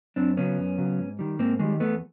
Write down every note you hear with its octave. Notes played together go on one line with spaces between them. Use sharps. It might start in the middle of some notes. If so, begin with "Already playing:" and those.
F#2 C4 D4
C#3 F#3 B3 C#4
F#2
C#3 F#3
G#2
D#3 G3
G#2 A#3 C4
D#3 G3 G#3 A#3
E2 A3 B3